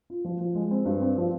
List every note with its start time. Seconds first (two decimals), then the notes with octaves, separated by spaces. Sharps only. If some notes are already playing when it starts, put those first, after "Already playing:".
0.10 F4
0.24 F3
0.41 F3
0.55 G#3
0.71 C4
0.85 G2
1.02 C4
1.17 F3